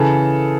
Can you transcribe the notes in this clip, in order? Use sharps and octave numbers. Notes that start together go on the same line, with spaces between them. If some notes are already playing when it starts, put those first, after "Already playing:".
Already playing: C#3 E3 A4